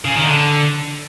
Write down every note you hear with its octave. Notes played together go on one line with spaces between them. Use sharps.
C#3
D#3
D3